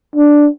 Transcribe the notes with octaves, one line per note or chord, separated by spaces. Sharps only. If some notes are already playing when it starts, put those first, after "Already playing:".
D4